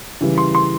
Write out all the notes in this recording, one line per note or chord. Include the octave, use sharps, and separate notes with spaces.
C#3 E3 G3
C6
C6